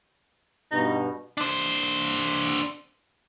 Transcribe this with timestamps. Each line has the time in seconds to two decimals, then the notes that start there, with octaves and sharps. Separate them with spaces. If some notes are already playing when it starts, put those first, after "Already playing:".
0.72 G2 B2 D#4
1.38 D4 C5